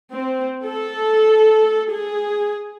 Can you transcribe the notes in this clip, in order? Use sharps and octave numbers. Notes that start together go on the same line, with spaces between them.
C4
A4
G#4